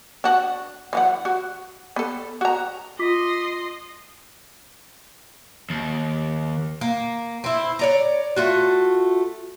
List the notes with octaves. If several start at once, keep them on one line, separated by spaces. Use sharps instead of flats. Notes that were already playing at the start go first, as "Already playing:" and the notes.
D4 F#4
E3 F#3 F#5
F#4
B3 A4
F#4 A#5
F4 D#5 C6 D6 B6
D#2
A#3
C4 E4
C#5 D5 A#5
A3 F4 F#4